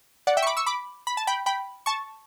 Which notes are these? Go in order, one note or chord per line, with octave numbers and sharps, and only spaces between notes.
D5 F#5
E5 G5
C#6
B5 D6
C#6 E6
B5 D6
B5
A5
G5 B5
G5 B5
A5 C#6